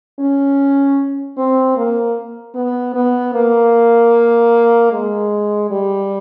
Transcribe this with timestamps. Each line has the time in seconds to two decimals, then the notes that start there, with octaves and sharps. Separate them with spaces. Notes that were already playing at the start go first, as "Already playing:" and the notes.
0.19 C#4
1.37 C4
1.77 A#3
2.55 B3
2.94 B3
3.34 A#3
4.92 G#3
5.71 G3